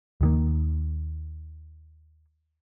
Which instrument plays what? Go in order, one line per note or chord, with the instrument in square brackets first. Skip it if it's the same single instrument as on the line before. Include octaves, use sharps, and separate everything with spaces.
[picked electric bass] D#2 D#3 A#3